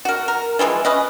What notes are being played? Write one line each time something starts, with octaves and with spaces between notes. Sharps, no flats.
F#4 A#4
A#4
E3 F3 G3 G#3
C#4 B4 D#5